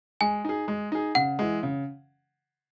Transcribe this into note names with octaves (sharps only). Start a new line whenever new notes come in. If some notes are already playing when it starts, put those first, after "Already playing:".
G#3 G#5
D#4 G#4
G#3
D#4 G#4
C#3 F#5
E3 G#3
C#3